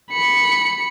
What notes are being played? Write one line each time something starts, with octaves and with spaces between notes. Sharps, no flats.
B5 C#7